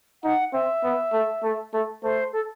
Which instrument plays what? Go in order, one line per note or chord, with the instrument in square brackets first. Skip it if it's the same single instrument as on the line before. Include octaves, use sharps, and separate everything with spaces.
[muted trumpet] D#4 [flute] F#5
[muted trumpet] C4 [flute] E5
[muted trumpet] B3
A3
A3
A3
[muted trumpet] A3 [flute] C5
[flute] A4